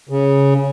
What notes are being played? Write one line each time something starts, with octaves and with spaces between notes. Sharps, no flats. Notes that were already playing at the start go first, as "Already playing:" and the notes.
C#3